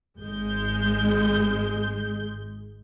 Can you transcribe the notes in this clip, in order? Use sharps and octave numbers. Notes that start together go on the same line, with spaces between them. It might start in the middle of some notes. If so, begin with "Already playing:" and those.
G#1 G#3 G6